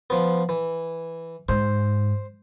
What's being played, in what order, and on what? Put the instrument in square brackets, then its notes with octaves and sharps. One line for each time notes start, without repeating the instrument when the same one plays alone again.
[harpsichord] F3 B3
E3
[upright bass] G#2 [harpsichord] C5